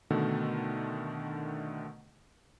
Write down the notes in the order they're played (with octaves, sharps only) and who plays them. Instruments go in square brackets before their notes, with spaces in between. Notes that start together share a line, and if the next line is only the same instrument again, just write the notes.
[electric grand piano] B2 D3 D#3 A3